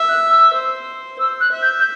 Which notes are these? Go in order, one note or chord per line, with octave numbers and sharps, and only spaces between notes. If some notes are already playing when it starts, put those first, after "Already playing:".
Already playing: E5
F#6
E6
C5
C5 E6
F#6
E5
G6
G6